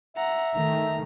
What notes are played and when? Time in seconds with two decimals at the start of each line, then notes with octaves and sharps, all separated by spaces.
0.16 E5 F#5 A#5
0.56 D#3 A3 A#5